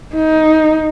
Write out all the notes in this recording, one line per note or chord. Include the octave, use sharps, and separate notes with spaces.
D#4